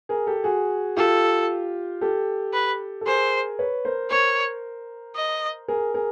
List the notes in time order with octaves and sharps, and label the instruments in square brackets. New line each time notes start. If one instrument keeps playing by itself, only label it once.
[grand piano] G#4 A#4
G4 A4
F#4 G#4
[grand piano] F4 G4 [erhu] A4
[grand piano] G4 A4
[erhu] B4
[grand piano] A4
[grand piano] G#4 A#4 [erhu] C5
[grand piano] B4 C#5
A#4 C5
[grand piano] A#4 C5 [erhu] C#5
[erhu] D#5
[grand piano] G#4 A#4
G#4 A#4